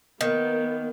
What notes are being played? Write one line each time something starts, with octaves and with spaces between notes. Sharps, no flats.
D#3 A#3 B3